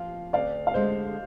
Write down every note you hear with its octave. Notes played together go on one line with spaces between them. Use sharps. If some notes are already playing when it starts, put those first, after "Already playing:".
Already playing: F3 A#3 F4 F5
D2 D5 F5
F5
D3 G#3 C5 D#5